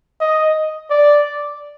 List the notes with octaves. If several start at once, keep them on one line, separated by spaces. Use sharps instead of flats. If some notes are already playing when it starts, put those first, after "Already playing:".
D#5
D5